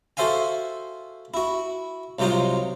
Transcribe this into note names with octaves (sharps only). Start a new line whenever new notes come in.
F#4 A4 C5 E5 F5 G#5
E4 F#4
C2 C3 F#3 D#4 F4 C5